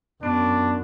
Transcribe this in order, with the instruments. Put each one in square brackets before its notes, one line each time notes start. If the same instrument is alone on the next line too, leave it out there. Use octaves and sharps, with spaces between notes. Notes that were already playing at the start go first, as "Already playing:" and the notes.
[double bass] F#2 [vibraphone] B3 [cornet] D4